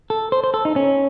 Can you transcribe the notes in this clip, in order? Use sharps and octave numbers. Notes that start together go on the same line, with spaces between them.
A4
C5
C5
A4
D#4
C#4